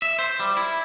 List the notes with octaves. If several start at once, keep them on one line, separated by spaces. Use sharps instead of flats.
E5
C5
G3
E4